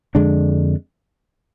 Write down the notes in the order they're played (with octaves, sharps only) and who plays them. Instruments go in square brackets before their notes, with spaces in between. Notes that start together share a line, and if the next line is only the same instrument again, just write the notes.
[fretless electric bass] F2 D3 G#3 D4